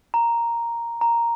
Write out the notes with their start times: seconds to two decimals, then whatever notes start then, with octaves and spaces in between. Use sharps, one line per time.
0.14 A#5
1.01 A#5